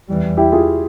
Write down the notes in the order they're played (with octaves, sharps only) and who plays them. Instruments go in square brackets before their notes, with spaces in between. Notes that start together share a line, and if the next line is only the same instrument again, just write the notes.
[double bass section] E2 E3 G3
[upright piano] E4 G4
F4 G#4